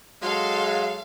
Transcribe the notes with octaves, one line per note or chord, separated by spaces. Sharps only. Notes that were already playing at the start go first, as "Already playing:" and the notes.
F#3 G#3 A4 F5 C6